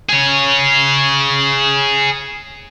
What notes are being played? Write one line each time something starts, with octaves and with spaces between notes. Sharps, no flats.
G#4 C#5